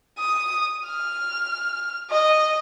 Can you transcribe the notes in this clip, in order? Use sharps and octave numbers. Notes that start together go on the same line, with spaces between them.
D#6
F6
D#5